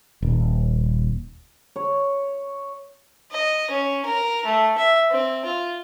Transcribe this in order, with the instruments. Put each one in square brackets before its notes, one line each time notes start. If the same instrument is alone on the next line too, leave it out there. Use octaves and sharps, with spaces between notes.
[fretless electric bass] D#1
[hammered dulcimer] C#5
[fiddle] D#5
C#4
A#4
A3
E5
C4
F4